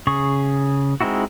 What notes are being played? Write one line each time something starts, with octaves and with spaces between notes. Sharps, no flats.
C#3 G#4 C#6
G#3 C4 D#4 E4 F#4